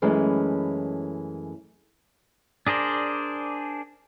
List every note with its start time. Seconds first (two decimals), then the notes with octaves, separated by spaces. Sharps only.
0.02 F#2 E3 G#3 A3 C#4
2.67 D4 G#4 A#4 C5 D5